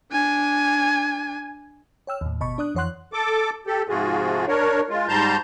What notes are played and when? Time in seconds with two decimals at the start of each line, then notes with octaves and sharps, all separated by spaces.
0.12 D4 G#5
2.07 C#5 G5 E6 F6
2.21 D#2 A2
2.40 G1 B2 D#5 A5 B5 C#6
2.58 D4 D5 D#6 F#6
2.75 F2 E3 C#5 F#5 C6 F#6
3.13 A4 D6
3.67 G4 A4
3.89 G#2 C3 F3 F4 F#4 G#4
4.47 D4 A#4 C#5
4.89 G#3 F4
5.08 G#2 G3 A5 A#5 C6 G6